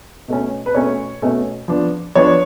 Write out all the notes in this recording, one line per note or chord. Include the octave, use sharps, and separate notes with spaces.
B2 A3 C#4
B4
B2 A3 C#4 C#5
B2 A3 C#4
F3 B3 D4
F3 B3 D4 C#5